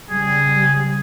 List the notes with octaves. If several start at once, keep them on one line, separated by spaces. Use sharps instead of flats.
C#3 G3 G#4